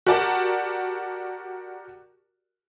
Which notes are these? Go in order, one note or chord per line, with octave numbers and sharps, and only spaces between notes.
F#4 G4 A#4 D5 A5